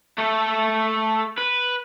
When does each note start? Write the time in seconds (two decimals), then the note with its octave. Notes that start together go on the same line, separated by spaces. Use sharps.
0.18 A3 A4
1.38 B4